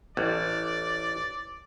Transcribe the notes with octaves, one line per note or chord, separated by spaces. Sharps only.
A1 D5